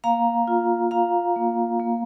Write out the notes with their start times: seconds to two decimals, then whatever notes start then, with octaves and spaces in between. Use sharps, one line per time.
0.04 A#3 F5 A#5
0.48 F4
0.91 F4 F5 A#5
1.36 A#3
1.80 A#3